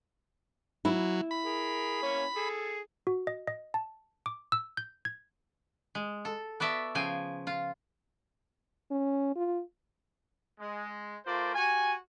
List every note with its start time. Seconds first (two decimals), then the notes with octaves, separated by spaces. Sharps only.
0.85 F#3 E4
1.31 B5
1.45 G#4 A#4
2.03 A#3 C#4 C#5
2.36 G#4 A4
3.07 F#4
3.27 D#5
3.47 D#5
3.74 A5
4.26 D6
4.52 E6
4.77 G6
5.05 G#6
5.95 G#3
6.25 A4
6.60 B3 F#4 D5 E5 A5
6.95 C#3 F3 G5 G#5
7.47 F4
8.91 C#4
9.36 F4
10.60 G#3
11.26 A3 F4 A#4 C5 D5
11.55 F#4 G4 G#5